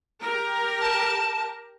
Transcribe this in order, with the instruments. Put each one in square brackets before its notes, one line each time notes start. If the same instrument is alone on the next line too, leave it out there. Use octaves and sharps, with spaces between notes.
[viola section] G4 A#4
[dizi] A5